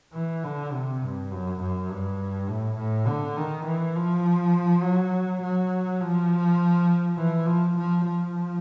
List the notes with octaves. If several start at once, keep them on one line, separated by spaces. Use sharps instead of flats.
E3
D3
C3
G2
F#2
F#2
G2
A2
A2
D3
D#3
E3
F3
F#3
F#3
F3
E3
F3
F3
F3